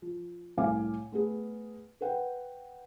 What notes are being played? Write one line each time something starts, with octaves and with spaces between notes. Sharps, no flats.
F3
C2 A2 F5 G#5 D6
A3 B3 G#4
A#4 B4 F#5 G5